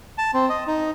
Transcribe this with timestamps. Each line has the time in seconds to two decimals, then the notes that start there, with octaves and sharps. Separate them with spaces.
0.18 A5
0.34 C4
0.49 D#5
0.67 D#4